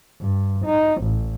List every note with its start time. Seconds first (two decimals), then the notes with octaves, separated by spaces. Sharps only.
0.21 G2
0.66 D#4
1.03 A1